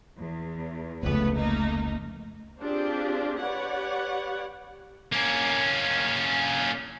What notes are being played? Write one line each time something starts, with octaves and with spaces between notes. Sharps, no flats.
E2
F1 C#2 A3 B3 B4
A3 A#3 D#4
C4 D4 F4 G4 G#4
G4 B4 C#5 D5 F#5
A#3 C#4